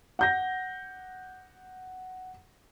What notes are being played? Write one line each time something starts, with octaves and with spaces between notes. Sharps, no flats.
F#5 G6 A#6